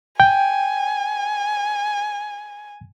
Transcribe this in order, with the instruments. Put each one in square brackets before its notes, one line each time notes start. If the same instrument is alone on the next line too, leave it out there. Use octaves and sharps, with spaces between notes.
[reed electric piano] G5 [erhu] G#5